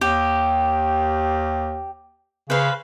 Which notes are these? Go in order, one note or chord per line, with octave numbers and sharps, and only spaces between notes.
D#2 G4
C#3 B4 C5 F5